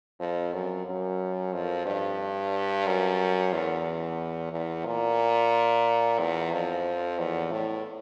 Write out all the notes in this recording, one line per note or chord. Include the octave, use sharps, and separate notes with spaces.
F2
F#2
F#2
F2
G2
F#2
E2
E2
A#2
E2
F2
E2
A2